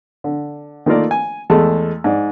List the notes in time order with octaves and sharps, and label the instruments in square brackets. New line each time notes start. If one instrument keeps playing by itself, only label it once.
[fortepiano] D3
D#3 A3 A#3 F4 A#4 D5
G#5
E2 G#3 A3 A5
G#2 D5